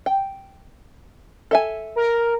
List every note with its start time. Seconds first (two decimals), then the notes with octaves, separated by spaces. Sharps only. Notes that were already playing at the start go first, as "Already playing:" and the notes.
0.06 G5
1.51 A4 E5 G#5
1.96 A#4